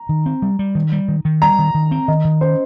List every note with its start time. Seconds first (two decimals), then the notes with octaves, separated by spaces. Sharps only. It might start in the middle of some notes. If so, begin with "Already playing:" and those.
Already playing: A#5
0.09 D#3
0.26 C4
0.42 G3
0.59 G3
0.75 D#3
0.92 G3
1.08 D#3
1.25 D#3
1.42 G3 A#5
1.59 D#3
1.75 D#3
1.91 C4
2.08 D#3 D#5
2.25 D#3
2.41 C#4 C5